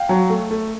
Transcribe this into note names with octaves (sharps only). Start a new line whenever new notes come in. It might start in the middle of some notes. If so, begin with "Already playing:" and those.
Already playing: F5 G5
F#3
A3
A3